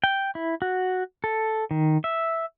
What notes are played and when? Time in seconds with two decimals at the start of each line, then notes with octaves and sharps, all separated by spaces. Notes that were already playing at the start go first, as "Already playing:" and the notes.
0.04 G5
0.35 E4
0.62 F#4
1.24 A4
1.71 D#3
2.04 E5